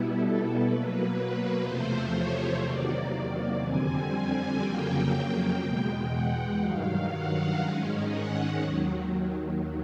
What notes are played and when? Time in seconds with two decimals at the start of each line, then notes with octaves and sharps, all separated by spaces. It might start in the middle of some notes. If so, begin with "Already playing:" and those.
Already playing: B2 G3 B3 E4
0.12 A4
0.62 B2 F#3 A#3 B4
1.62 E2 C3 F3 A3 C5
2.12 C#5
2.61 E2 C3 D#3 F#3 A#3 D5
3.61 F2 D3 G3 C4 G#5
4.61 F2 C#3 F#3 A#3 G5
5.61 E2 B2 G#3 G5
6.10 F#5
6.61 G2 D#3 F#3 F5
7.11 F#5
7.60 G#2 D#3 G#3 C#4
8.11 F#5
8.60 D#2 D#3 F#3